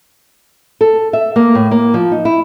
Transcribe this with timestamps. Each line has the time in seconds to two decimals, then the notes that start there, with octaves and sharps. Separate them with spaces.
0.81 A4
1.13 E5
1.36 A#3
1.55 A2
1.71 A#3
1.94 F3
2.11 D#4
2.25 E4